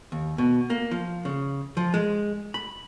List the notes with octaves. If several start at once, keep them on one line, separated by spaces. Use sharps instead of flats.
D#2
B2
A#3
F3
C#3
F3
G#3
B5